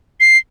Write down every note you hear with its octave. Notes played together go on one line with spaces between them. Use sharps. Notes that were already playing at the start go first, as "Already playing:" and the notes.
C7